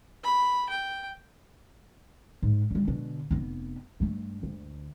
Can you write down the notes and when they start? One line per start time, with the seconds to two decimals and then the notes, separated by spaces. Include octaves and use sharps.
0.24 B5
0.69 G5
2.42 G#2
2.71 D3 G3
2.88 B2 D3
3.31 F1 B3
4.00 G2 A3
4.43 D2